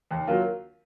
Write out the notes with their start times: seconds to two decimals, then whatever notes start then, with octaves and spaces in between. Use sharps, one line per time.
0.11 D#2
0.27 F#3 A#3 F4